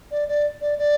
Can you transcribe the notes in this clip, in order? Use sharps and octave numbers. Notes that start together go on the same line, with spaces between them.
D5
D5
D5
D5